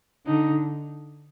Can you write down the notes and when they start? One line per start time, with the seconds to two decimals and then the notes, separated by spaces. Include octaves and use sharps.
0.26 D3 D#4